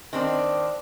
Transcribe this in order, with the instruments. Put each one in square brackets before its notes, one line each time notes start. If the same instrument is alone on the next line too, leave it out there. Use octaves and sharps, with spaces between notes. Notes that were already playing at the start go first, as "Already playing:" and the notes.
[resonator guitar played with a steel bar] D#3 C4 D4